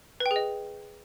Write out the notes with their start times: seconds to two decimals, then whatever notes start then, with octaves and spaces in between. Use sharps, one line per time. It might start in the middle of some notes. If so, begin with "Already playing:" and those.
0.20 B4
0.26 G5
0.31 G#4
0.36 D#5